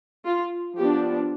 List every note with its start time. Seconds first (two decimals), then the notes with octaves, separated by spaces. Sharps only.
0.26 F4
0.77 F3 B3 D4 G4